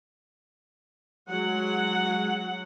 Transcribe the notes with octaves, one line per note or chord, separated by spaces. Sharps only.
F#3 G#3 F#5